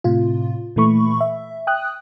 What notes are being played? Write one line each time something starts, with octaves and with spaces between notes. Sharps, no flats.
A2 C3 F4
A#2 E3 A3 B5 C#6
E5
G5 D#6 F#6